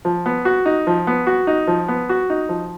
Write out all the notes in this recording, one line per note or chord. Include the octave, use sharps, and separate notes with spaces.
F3
B3
F#4
D#4
F3
B3
F#4
D#4
F3
B3
F#4
D#4
F3